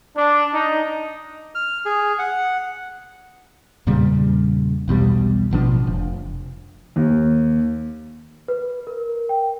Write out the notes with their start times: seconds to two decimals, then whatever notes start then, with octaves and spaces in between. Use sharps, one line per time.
0.16 D4
0.54 D#4
1.55 F6
1.85 G#4
2.19 F#5
3.87 E2 A#2 C#3 G3
4.88 B1 E2 B2 G3
5.51 A1 B2 F3 D4
5.87 F1
6.96 D#2
8.48 B4
8.87 A#4
9.29 G5